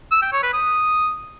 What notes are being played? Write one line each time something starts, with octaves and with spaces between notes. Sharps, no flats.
E6
G5
C#5
B4
D#6